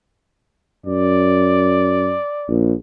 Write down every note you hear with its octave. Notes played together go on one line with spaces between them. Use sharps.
F#2 D5
A#1